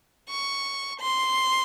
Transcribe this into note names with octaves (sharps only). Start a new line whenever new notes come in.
C#6
C6